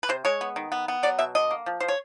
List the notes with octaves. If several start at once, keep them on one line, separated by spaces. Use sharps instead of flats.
B4
C3 C5
G#3 C#5
B3
D#3
B3
B3
F#3 D5
B2 E5
D3 D#5
A#3
F3
F3 C5
C#5